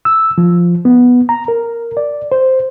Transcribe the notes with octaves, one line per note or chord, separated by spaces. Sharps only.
E6
F3
B3
A#5
A#4
D5
C5